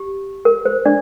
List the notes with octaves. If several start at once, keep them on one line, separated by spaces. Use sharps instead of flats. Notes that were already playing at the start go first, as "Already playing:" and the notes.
Already playing: G4
A#4
C5
D4 D5